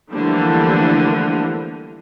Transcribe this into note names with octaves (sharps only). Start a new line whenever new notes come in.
D3 E3 F3 G3 A3 A#3